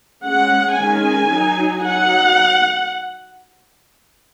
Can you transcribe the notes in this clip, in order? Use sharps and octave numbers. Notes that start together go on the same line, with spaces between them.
G#3 C#4 F#5
D#3 G#3 C#4 G#5
F#3 D#4
F#3 D#4 F#5